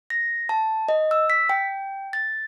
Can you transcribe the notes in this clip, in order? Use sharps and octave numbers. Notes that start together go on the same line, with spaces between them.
A#6
A5
D#5
E6
B6
G5
A6